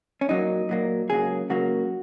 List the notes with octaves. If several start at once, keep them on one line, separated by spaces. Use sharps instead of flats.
C#4
A#2 F#3 A#3 D#4
A#2 F#3 A#3
C#2 C#3 F#3 A#3 G#4
C#2 C#3 F#3 A#3 F#4